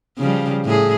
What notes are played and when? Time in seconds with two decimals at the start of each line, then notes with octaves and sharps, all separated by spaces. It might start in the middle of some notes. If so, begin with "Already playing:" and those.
0.18 C#3 F3 G3
0.65 A2 G#4